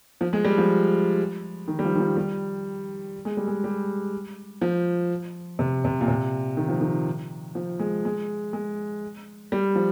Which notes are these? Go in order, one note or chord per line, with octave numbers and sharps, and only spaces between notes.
F3
G#3
G3
F3
D#3
G3
F3
D#3
F3
G3
G#3
G3
G#3
G3
F3
C3
C3
A#2
C3
D#3
F3
D#3
F3
G#3
G#3
G#3
G3
F3